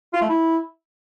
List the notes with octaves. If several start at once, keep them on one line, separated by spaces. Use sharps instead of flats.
F4
A3
E4